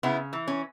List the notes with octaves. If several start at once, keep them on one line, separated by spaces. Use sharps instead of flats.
C#3 B3 E4
E3
C#4